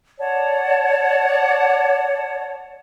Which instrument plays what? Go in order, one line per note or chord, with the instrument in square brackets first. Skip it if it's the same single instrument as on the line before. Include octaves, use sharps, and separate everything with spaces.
[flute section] C#5 D5 F#5 A5